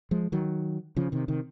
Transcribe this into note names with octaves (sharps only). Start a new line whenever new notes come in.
F3 G#3
D#3 F#3
C#3 F3
C3 D#3
C3 D#3